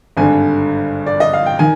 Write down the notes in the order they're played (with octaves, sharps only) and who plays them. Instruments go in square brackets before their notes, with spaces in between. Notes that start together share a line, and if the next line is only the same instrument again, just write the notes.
[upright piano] G#1 G2 D3 G#5
D5
D#5
F5
G5
D#3 G#5